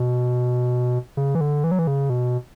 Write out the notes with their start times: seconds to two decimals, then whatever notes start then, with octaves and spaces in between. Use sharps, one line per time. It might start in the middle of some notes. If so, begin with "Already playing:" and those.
Already playing: B2
1.17 C#3
1.35 E3
1.41 D3
1.64 E3
1.71 F#3
1.79 E3
1.87 C#3
2.10 B2